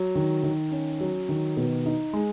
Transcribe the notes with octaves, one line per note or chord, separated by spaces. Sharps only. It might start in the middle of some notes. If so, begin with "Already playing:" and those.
Already playing: F#3
D#3
D#3
C#4
F#3
D#3
B2
D#4
G#3